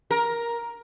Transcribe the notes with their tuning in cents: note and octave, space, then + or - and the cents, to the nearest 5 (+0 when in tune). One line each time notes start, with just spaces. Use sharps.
A#4 +10